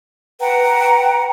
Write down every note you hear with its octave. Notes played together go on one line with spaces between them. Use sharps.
B4 F#5 G5 A#5